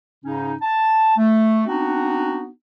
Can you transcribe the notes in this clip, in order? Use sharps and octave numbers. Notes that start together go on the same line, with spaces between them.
G#2 C#3 C#4 D#4
A5
A3
B3 C4 D4 D#4 F#4